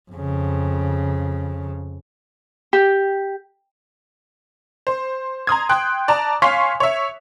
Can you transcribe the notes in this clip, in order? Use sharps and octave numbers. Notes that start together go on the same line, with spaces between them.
F2 C#3
G4
C5
A#5 C6 D#6 G#6
G5 C6 F#6
D5 A5 A#5
C#5 F5 G#5 C6 C#6 B6
C#5 E5